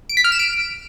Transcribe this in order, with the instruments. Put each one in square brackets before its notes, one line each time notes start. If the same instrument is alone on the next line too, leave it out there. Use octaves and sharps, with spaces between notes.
[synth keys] D7
B6
F6
E7
D7